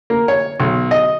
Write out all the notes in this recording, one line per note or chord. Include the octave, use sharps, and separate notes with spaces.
A#3
C#5
B1
D#5